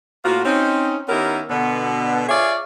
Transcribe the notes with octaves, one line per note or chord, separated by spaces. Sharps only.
A2 A#3 F4 F#4
C4 C#4 D#4
D#3 B3 C#4 E4 G4 A#4
B2 D3 B3
F4 G#4 C#5 D5 E5